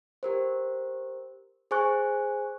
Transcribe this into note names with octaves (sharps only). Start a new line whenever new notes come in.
G4 A#4 C5
G#4 C5 G#5 C#6 F#6